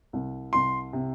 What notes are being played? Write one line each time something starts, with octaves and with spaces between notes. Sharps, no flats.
C2
C2 C6
C3